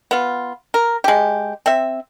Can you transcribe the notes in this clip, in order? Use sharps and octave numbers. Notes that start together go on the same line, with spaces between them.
B3 F4
A#4
G#3 G4
C4 E5